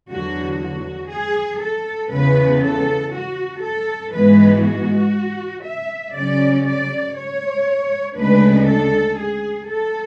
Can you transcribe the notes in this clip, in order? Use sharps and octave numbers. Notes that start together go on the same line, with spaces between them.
E2 D3 F#3 F#4
F#4
G#4
A4
E2 C#3 E3 B3 B4
A4
F#4
A4
G#2 E3 G#3 B3 B4
F#4
E5
C#3 F#3 C#4 D5
D5
C#5
D2 C#3 G#3 D4 B4
A4
G#4
A4